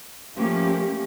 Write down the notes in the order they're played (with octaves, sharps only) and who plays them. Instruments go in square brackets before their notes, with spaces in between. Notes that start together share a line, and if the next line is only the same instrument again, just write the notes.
[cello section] F3 A3 A#3 C#4 G4